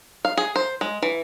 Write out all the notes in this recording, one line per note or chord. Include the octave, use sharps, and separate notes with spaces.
F5
G#4
C5
G#3
E3